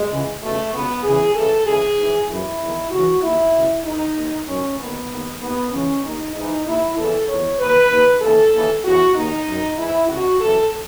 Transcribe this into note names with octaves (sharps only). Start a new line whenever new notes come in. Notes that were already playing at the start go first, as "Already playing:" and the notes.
Already playing: G#3
C#2 C#3 E3
C#2 B2 A3
C#2 B2 B3
E2 C#3 E3 G#4
C#2 C#3 E3 A4
C#2 C#3 E3 G#4
G#2 E3
F#2 E3 E4
E2 D#3
C#2 C#3 E3 F#4
D#2 D#3 E4
C#2 B2
G#2 D#3 D#4
D#2 D#3
F#2 D#3 C#4
D#2 D#3 B3
D#2 D#3
D#2 D#3 B3
C#2 C#3 E3 C#4
D#2 D#3 D#4
G#2 E3 D#4
D#2 D#3 E4
E2 C#3 E3 A4
E2 D#3 C#5
D#2 D#3 B4
D#2 D#3
D#2 C#3 E3 A4
D#2 C#3 E3
E2 C#3 E3 F#4
D#2 D#3 D#4
F#2 D#3
G#2 E3 E4
C#2 B2 F#4
F#2 C#3 E3 A4